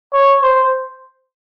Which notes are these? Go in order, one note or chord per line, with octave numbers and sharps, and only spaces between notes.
C#5
C5